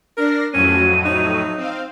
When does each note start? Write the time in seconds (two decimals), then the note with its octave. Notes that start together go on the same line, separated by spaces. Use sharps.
0.17 D4 A#4 A#6 C7
0.54 F2 A2 F#3 C#4 D#7
1.05 D#4
1.57 C4 F5